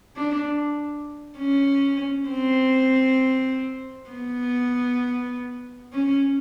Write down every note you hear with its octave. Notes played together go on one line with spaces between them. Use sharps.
D4
C#4
C4
B3
C#4